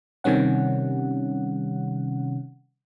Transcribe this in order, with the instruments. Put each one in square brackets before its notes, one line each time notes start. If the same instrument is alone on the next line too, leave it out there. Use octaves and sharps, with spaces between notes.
[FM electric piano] C3 D#3 G3 C#4 F#5